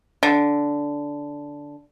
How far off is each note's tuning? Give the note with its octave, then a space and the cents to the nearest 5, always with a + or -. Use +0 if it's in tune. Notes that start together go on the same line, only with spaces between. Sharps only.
D3 -10